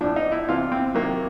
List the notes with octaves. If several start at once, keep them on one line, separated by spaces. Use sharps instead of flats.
A2 F3 D4
D#4
E4
C3 E3 F4
C4
C3 D#3 F#3 A#3